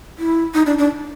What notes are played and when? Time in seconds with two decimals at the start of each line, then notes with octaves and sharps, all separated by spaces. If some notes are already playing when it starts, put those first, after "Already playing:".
0.19 E4
0.54 D#4
0.66 D4
0.78 D4